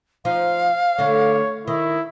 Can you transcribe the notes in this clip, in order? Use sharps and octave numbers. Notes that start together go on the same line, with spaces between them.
F3 D#4 F5
D3 A3 C#5
D#3 E4